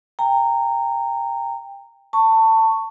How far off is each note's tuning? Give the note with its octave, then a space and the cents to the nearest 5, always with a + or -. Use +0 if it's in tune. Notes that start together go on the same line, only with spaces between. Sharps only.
G5 +20 A#5 -15
A5 +25 C#6 +0